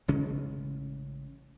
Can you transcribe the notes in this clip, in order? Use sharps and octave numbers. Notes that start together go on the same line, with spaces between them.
A1 C#3 G#3 C#4